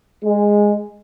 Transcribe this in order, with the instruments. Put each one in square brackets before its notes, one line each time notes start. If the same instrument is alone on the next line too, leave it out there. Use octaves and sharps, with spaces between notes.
[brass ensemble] G#3